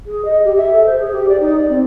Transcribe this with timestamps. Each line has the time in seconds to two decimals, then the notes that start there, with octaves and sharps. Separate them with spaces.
0.06 G#4
0.25 D#5
0.45 G4
0.57 E5
0.73 A4
0.86 C5
1.00 G#4
1.12 G4
1.29 D5
1.40 D#4
1.56 D5
1.69 C4